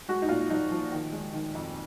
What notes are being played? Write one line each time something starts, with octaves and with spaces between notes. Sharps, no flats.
G#3 F#4
D#4
A#2 F4
F3 D#4
F3
D#3
G#3
D#3
F2